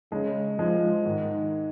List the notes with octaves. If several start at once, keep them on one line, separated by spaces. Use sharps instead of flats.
C#3 G#3
F3 G#3
G#2 D#3